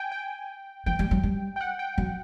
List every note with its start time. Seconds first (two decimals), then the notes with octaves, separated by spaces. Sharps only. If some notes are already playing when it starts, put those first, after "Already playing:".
Already playing: G5 G#5
0.12 G5
0.86 F3 G5
0.99 G3
1.11 F#3
1.23 G3
1.56 G5
1.61 F#5
1.79 G5
1.98 F#3